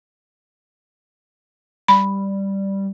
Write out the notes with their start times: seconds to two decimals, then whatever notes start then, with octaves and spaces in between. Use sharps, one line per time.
1.88 G3 B5